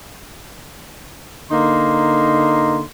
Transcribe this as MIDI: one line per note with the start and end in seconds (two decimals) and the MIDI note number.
1.51 2.83 50
1.51 2.83 58
1.51 2.83 63
1.51 2.83 84